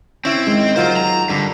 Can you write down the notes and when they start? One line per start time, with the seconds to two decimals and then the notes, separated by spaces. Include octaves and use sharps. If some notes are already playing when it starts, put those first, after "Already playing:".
0.25 C4 C#4 E4
0.47 D#2 G#3
0.76 F#3 F4 A#4 C5
0.97 A#5
1.29 G2 D3